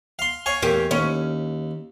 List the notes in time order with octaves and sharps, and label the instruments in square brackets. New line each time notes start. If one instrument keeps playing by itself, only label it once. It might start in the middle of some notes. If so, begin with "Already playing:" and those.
[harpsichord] F5 C6
C#5 F5 G#5
[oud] E2 A#3 G4
[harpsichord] D#2 [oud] C#4